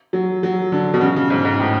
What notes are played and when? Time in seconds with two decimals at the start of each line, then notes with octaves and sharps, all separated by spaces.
0.13 F#3
0.43 F#3
0.72 D3
0.94 B2
1.01 C#3
1.16 C#3
1.30 G#2
1.45 G#2
1.60 A2